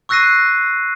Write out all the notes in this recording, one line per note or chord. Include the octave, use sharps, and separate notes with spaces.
C#6 E6 F#6 A#6 C7 D#7